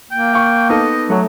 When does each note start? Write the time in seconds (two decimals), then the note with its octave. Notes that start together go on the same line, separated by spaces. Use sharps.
0.11 A#3 G5
0.33 F5 C#6
0.69 B3 D#4 A4 D#5
1.10 F#3 A3